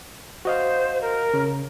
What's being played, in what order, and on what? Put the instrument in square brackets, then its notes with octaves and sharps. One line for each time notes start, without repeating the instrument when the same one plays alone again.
[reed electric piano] F#4 D#5 F5 [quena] C5
[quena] A#4
[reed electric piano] C#3